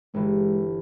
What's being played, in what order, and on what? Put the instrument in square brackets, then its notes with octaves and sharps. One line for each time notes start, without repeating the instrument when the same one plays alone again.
[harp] G1 E3 [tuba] G#3